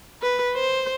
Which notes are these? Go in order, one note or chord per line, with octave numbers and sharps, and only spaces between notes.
B4
C5